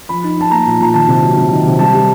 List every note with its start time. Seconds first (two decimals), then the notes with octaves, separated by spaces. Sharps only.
0.09 F3 B5
0.24 D#4
0.37 D#4 A5
0.51 A#3 A#5
0.66 A#2
0.80 A#2 A#5
0.94 D#3 A5
1.08 C3
1.23 F#3
1.37 C3
1.52 D#3
1.66 C3
1.79 G3 A5
1.94 G3